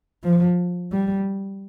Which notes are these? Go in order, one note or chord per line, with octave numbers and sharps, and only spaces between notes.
F3
G3